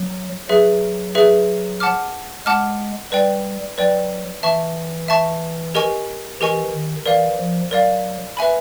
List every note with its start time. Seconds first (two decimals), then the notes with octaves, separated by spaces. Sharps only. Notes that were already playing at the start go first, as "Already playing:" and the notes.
Already playing: F#3
0.49 F#3 G#4 B4 E5
1.15 G#4 B4 E5
1.80 F#5 A5 D6 F6
2.46 G#3 F#5 A5 D6 F6
3.12 G3 B4 D5 G5
3.78 F#3 B4 D5 G5
4.43 E3 E5 A5 C#6
5.08 E5 A5 C#6
5.75 G4 A#4 D#5 G#5 C#6
6.40 E3 G4 A#4 D#5 G#5 C#6
6.73 D#3
7.06 E3 A#4 D5 F5
7.38 F3
7.71 F#3 A#4 D5 F5
8.37 B4 E5 G#5 B5